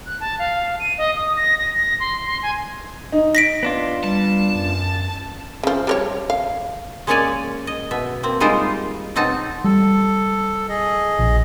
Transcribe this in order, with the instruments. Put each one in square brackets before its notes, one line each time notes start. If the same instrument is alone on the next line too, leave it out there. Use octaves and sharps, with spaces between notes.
[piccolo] F#6
A5
F5
D#7
D#5
D#6
A#6
A#6
A#6
C6
C6
G#5
[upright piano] D#4
[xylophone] A#6 B6 D7
[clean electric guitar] B3 D4 F4
[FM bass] G3 [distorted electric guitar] A5
[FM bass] F#2
[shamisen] C#3 F3
G3 A#4 C#5
F5
[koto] G#3 A#3 C#4 C#5 D5 G#5
D#5
B2 E5
A#3 C4
G3 G#3 D#4 F4 A#4 C5
B2 F#3 C4 D#4 A5
[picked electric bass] G3 [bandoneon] A4
[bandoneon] G#4 D#5
[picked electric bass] A#1